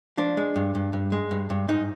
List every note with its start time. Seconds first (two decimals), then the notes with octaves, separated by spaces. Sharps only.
0.17 F3 D4
0.37 G#3
0.56 G2
0.75 G2
0.93 G2
1.12 G#3
1.31 G2
1.50 G2
1.68 G#2 D#4